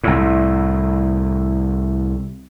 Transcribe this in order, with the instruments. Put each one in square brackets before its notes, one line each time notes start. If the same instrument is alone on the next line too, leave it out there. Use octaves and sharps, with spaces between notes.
[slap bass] C2 A2